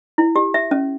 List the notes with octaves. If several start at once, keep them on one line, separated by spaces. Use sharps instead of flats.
E4
G4
E5
C#4